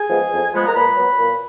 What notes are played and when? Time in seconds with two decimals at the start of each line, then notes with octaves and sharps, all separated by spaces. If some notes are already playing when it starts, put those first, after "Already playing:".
Already playing: G#4 G#5
0.09 F3 G#3 B3
0.31 F2
0.53 F3 G#3 B3
0.67 A#5
0.74 A#2 B4 B5
0.96 F#3 B3
1.18 A#2